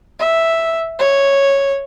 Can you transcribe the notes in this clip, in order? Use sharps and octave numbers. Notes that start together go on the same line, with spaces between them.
E5
C#5